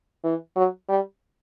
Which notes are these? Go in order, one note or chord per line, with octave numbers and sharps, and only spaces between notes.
E3
F#3
G3